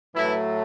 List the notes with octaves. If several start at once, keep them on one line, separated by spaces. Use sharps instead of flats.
A2 E3 F#3 A3 E4